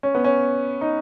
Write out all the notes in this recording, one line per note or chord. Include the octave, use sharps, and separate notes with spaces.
C#4
B3
C#4
D#4